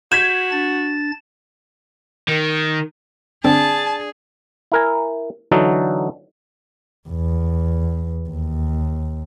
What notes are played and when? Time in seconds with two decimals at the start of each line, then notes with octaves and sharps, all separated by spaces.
0.12 F#4 G6 G#6 B6 E7
0.51 D4 A6
2.28 D#3
3.44 D3 C4 D4 G#4 A5
4.72 E4 A#4 G#5
5.51 D3 E3 F#3 D#4 F#4 A4
7.09 E2
8.29 D#2